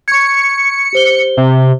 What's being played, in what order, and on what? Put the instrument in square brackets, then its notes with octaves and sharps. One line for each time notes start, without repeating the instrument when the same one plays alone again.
[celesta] C#6 G#6 [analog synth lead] C#7
[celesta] G4 C5 G7
[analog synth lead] C3